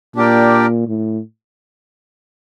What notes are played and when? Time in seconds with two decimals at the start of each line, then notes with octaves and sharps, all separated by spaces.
0.16 A#2 D4 G4 A#4 D5 G5
0.88 A2